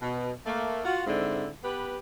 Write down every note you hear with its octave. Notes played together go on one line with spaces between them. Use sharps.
B2
A3 A#3
F4 F#4
G#2 D3 C4 E4
B3 G4 B4